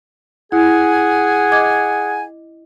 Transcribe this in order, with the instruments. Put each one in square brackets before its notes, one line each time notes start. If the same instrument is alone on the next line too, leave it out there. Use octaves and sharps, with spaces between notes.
[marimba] E4 [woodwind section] G#4 F#5 G#5
[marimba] D#5 D6 G#6